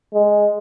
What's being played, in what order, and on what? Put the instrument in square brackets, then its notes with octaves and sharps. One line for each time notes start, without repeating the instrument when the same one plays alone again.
[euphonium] G#3